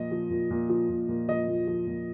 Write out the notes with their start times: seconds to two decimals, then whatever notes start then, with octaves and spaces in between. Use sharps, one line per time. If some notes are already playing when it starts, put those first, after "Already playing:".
Already playing: A#2 F3 D#5
0.11 F3
0.30 A#2
0.51 A#2
0.69 F3
0.89 A#2
1.08 A#2
1.28 F3 D#5
1.48 A#2
1.67 F3
1.87 A#2